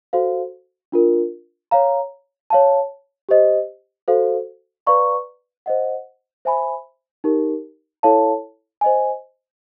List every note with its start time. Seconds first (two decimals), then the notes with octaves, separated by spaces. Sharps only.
0.13 F#4 A4 C5 F5
0.92 D4 F4 A#4
1.71 C#5 F5 A#5
2.50 C#5 F5 A5
3.29 G4 C5 D#5
4.08 F#4 A4 C5 F5
4.87 B4 D5 F5 A#5 C#6
5.66 C5 D#5 F#5
6.45 C5 E5 G#5 B5
7.24 D#4 G4 A#4
8.03 E4 A4 C#5 F5 A5
8.81 C5 D#5 G#5